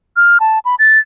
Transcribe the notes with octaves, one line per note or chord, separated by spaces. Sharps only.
F6
A5
B5
A6